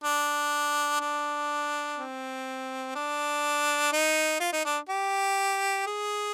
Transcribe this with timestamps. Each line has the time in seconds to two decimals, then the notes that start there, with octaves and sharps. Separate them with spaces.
0.04 D4
1.01 D4
1.98 C4
2.95 D4
3.93 D#4
4.40 F4
4.53 D#4
4.65 D4
4.89 G4
5.87 G#4